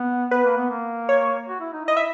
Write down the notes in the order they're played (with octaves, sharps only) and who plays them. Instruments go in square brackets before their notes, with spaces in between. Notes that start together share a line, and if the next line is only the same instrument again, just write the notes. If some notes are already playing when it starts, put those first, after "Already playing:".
Already playing: [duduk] B3
[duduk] B3 [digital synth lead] B4
[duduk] A#3
B3
A#3
[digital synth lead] C#5
[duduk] F#4
E4
D#4
[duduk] E4 [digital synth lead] D#5
[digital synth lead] E5